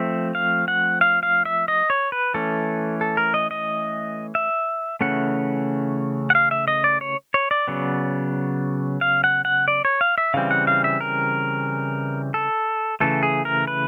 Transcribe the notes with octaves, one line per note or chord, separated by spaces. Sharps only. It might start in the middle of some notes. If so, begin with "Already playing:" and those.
Already playing: F3 A3 C4 E5
F5
F#5
F5
F5
E5
D#5
C#5
B4
E3 A3 C#4 A4
A4
A#4
D#5
D#5
E5
C#3 E3 A3 C#4 F#5
F#5
F5
E5
D#5
D5
C#5
C#5
D5
C#3 F#3 B3
F5
F#5
F#5
D5
C#5
F5
E5
C#3 E3 G3 C4 F5
F#5
F5
E5
A#4
A4
C#3 E3 A3 A4
G#4
A#4
B4